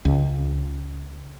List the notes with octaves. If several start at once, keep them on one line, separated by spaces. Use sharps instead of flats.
C#2